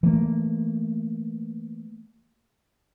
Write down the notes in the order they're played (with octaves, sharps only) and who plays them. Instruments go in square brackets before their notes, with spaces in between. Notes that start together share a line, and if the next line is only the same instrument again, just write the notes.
[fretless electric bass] E3 A3 A#3